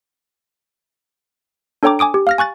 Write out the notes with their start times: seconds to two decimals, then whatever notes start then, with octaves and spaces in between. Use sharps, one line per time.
1.83 D4 A4 C#5 G5 A#5 D6
1.99 G#5 D6 D#6 D7
2.14 G4
2.27 F5 F6 A#6
2.38 G#5 C#6 F#6 A6